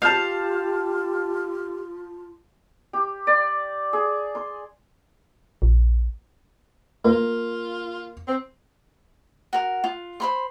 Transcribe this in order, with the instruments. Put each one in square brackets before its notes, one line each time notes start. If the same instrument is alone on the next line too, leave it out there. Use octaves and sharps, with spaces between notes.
[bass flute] F4 [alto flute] G4 [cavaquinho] F5 [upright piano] A5 F6 G6
[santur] G4
D5
G#4
C6
[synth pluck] A#1
[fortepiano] A#3 [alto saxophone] F4
[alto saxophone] C4
[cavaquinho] F#4 A#4
F4
C5 B5 C6